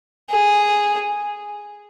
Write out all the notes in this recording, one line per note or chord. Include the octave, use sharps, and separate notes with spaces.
G#4